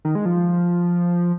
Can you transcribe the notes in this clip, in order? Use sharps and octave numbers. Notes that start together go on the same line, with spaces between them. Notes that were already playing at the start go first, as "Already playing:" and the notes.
D#3
G#3
F3